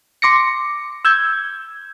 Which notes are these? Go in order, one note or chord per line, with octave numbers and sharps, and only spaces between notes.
C6 D6 A#6 C#7
E6 G6 G#6